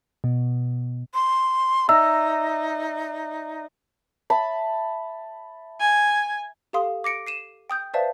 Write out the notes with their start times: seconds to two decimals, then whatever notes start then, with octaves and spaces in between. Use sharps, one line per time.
0.24 B2
1.13 C6
1.89 D#4 D5 E5 A#5 E6
4.30 E5 A5 B5
5.80 G#5
6.73 G4 A4 F5 C6 D#6
7.04 D6 A#6 C#7 D7
7.27 C7 D#7 E7
7.70 G5 D#6 G6
7.94 B4 C5 D5 E5 F5 A5